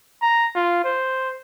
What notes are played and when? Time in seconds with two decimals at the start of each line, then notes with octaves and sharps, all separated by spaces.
0.22 A#5
0.55 F4
0.84 C5